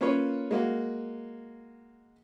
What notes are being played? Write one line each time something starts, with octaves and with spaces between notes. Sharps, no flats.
A#3 C#4 F4 B4 C#5
G#3 A#3 F#4